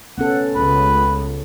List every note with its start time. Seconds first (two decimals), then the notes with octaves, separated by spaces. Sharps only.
0.18 B3 C#4 A4 F#5
0.55 C#2 B4